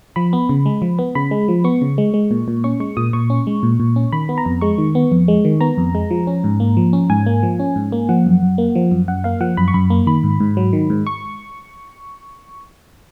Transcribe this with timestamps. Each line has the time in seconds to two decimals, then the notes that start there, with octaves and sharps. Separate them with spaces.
0.16 F3 B5
0.33 B3
0.49 C#3
0.66 G#3
0.82 F3
0.99 B3
1.15 C#3 B5
1.31 G#3
1.48 F3
1.64 B3 C#6
1.81 C#3
1.98 G#3
2.14 G#3
2.31 A#2
2.48 A#2
2.64 C#4 C#6
2.80 G#3 C#6
2.97 A#2 D#6
3.13 A#2 C#6
3.30 C#4
3.47 G#3
3.63 A#2
3.80 A#2
3.96 C#4
4.12 D#3 B5
4.29 B3
4.38 A#5
4.45 F2
4.61 G#3 C#6
4.78 D#3
4.95 B3
5.12 F2
5.28 G#3
5.45 D#3
5.61 B3 A#5
5.78 F2
5.95 G#3
6.11 F3
6.27 C#4
6.44 G#2
6.60 A#3
6.77 F3
6.93 C#4
7.10 G#2 G#5
7.26 A#3
7.43 F3
7.59 C#4
7.76 G#2
7.92 A#3
8.09 F3 F#5
8.26 F#2
8.42 F#2
8.58 A#3
8.75 F3
8.91 F#2
9.08 F#2 F#5
9.24 A#3 F5
9.41 F3 F#5
9.57 F#2 B5
9.68 C#6
9.74 F#2 B5
9.90 A#3
10.07 D#3 B5
10.24 G#2
10.40 G#2
10.57 F#3
10.73 D#3
10.90 G#2
11.07 C#6